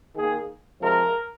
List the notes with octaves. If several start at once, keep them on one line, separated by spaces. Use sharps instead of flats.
D#3 A#3 G#4
C3 F3 G#3 A#4